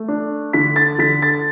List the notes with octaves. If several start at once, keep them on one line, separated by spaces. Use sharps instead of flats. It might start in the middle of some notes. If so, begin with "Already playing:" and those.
Already playing: A3
D4
D3 B6
A6
D3 B6
A6